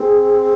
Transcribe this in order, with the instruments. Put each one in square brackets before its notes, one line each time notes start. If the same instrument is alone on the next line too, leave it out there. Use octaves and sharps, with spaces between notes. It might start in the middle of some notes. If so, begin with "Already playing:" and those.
Already playing: [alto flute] C4 [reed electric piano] G#4